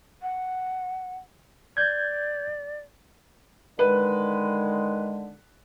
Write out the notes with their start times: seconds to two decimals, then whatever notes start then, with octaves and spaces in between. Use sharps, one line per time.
0.22 F#5
1.77 D5 G6 G#6
3.79 D3 D#3 G#3 B4